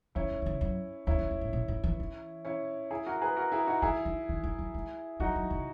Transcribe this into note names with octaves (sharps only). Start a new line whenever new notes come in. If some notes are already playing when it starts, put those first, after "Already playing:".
D#3 C#4 E4
E3
D#3
C#3
F#2
E2 C#4 E4
E2
F#2
G#2
A#2
G#2
E3
E3
C#4 E4
E4 G#4
F#4 A#4
G#4 B4
F#4 A#4
E4 G#4
D#4 F#4
E3 E4 G#4
D#3
D#3
E3
F#3
G#3
F#3 D#4 F#4
F#3
C#3